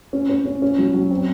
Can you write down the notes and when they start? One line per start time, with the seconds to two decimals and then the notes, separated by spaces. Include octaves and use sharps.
0.13 C#4
0.30 C#4
0.46 C#4
0.62 C#4
0.79 F#3
0.94 F#3
1.11 C4